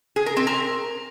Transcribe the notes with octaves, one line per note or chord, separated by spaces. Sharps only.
G#4
A#4
C4
A#4